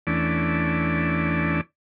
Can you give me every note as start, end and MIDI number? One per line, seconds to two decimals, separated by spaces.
0.07 1.61 40
0.07 1.61 52
0.07 1.61 57
0.07 1.61 61
0.07 1.61 62
0.07 1.61 74